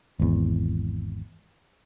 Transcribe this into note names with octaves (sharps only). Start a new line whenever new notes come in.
G#1 E2